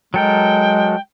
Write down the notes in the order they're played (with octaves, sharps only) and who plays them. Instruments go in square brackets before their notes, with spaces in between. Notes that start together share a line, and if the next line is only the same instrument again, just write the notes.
[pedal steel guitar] F#3 A4 A#4 [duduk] G#3 [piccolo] G5